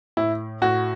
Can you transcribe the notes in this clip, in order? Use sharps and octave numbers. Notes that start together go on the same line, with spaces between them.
A2 E4
A2 F#4